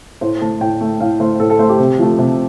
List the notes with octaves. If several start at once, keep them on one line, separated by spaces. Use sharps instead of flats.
A2 C5
A3 A5
A2 G5
A3
A2 F5
A3 C5
A2 A4
A4
A3 C5
G4
C3
F3 A3
C3